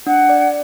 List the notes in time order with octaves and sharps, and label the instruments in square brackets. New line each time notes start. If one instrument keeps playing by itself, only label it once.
[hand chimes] D4 [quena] F#5
[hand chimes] D5